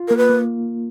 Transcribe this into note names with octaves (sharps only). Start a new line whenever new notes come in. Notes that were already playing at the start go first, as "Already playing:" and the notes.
Already playing: F4
A#3 A#4
B4
A#3